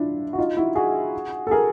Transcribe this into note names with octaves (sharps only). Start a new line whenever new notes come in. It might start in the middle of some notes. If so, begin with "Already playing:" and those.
Already playing: D4 E4 F4
F#4
D#4 F4
E4 F#4
F#4 G#4
A4
G#4 A#4